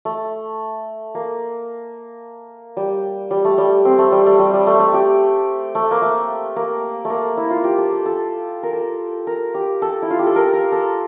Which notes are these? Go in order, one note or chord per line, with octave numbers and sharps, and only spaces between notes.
A3
A#3
G3
G3
A3
G3
C4
A3
G3
A3
G3
G3
A3
A3
G4
A3
A#3
A3
A#3
A3
A#3
E4
F4
G4
A4
A4
A4
A#4
A4
A#4
G4
A4
E4
F4
G4
A4
A#4
A#4
A4